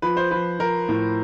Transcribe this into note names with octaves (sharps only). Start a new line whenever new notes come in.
F3 B4
C5
F3 B4
F3 A#4
A2